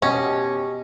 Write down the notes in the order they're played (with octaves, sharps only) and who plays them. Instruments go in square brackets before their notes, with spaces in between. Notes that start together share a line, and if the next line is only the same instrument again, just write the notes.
[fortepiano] B2 [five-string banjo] C#4 [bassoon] G4 [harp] D#5